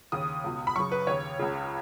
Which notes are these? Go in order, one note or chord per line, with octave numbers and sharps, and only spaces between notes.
D#2 C#3 D#6
C#2 B2
B5
F#2 C#3 C#6
B4
D#2 C#3 C#5
C#2 C#3